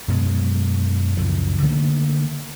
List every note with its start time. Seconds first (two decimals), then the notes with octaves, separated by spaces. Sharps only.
0.08 F#2 B2 F#3 G#3
1.17 C#2 F#2 F3
1.62 D3 D#3 A3 A#3